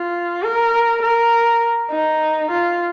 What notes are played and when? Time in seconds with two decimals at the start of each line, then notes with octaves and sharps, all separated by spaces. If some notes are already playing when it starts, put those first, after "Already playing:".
Already playing: F4
0.43 A#4
1.02 A#4
1.91 D#4
2.51 F4